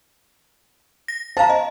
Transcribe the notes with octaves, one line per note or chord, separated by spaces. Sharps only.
A#6
C5 F5 A5 A#5
D#5